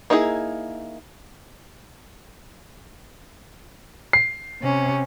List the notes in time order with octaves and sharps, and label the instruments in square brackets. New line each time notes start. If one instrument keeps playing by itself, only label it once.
[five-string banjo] A#3 D#4 E4 F#4 G#4
[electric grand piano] C7
[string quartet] C3 C#4